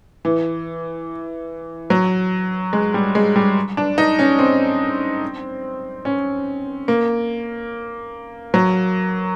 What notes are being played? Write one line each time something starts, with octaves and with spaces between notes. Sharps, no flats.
E3
F#3
G#3
G3
G#3
G3
D4
D#4
C#4
C4
C#4
A#3
F#3